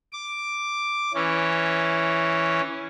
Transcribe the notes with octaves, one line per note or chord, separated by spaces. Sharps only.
D6
E3 C#4